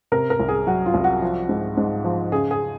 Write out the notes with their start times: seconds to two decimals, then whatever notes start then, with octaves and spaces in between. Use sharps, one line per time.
0.12 C3 A#4
0.30 A#4
0.40 C2
0.49 G#4
0.67 F#3 F#4
0.86 F4
0.94 C2
1.04 F#4
1.22 F3
1.49 G#2
1.77 G#2
2.04 F3
2.32 C#3 G#4
2.51 G#4